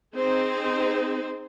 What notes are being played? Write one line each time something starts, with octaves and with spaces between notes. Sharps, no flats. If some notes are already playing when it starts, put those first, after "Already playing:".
C4 D#4 G#4 C5